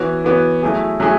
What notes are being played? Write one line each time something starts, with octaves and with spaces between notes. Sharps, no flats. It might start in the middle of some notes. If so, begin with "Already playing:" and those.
Already playing: E3 B3 F#4 C#5
E3 B3 F#4 C#5
F#3 A3 E4 G#4
F#3 A3 E4 G#4